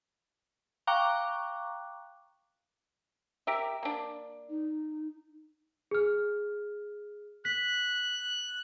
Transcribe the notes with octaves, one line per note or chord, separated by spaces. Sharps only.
F5 G5 A#5 C#6 D6 F#6
G4 A#4 E5
A#3 D4
D#4
G#4 F6
F#6 B6